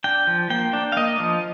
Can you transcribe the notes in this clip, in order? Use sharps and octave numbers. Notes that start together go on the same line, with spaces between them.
D4 G5
F3
A#3 G5
D4
F5
A#3 D#5
F3